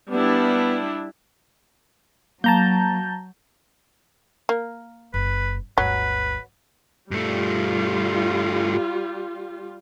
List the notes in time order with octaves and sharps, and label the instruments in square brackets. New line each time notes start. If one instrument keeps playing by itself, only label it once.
[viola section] G3 D4 E4 [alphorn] B3
[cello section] F#3 [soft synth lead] A#3 [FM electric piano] A5 A#5 G6
[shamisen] A#3
[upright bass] F#1 [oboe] B4
[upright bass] G1 D2 [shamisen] F#3 [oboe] B4
[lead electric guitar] G2 A3 [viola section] G3 F4